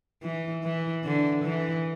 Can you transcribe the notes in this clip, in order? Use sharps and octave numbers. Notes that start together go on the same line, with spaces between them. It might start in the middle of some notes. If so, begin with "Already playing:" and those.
E3
E3
D3
E3